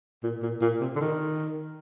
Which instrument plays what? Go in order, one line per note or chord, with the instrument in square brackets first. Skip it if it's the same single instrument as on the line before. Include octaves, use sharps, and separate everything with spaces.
[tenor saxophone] A#2
A#2
A#2
C3
D3
D#3